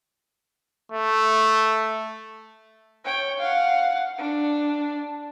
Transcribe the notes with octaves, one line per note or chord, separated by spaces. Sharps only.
A3
C#5 G5
F5 F#5
D4